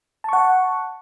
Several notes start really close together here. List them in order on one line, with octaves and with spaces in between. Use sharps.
A5 C#6 F#5